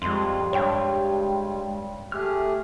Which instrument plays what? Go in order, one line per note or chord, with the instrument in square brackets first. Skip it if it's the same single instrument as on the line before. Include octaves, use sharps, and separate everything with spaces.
[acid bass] F2 [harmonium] G3 [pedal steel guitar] G#3 F4
[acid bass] G2 [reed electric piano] C#5 G5
[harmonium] A3 G4 G#4 [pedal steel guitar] E5 F6